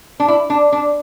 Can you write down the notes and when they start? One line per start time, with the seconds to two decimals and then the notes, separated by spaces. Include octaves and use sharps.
0.20 D4
0.28 E4
0.50 D4
0.72 D4